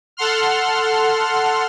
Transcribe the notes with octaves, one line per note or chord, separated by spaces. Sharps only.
A4 F#5 C6 F6